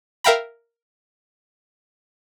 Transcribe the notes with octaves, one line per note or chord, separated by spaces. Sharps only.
A#4 E5 F5 G5 A#5 B5